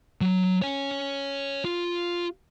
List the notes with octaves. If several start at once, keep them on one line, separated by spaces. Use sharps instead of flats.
F#3
C#5 G#5
F4